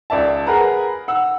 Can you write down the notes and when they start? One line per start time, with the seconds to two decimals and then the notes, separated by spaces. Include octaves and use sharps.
0.10 C#2 D5 E5 A5
0.47 G#4 A#4 B4 F#5 A#5
1.08 F#5 E6